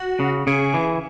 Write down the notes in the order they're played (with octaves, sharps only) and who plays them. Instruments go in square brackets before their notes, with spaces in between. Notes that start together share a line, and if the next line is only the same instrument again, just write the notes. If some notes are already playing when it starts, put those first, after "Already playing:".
Already playing: [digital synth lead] F#4
[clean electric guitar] C#3
[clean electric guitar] C#3 [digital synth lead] G#4
[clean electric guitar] E3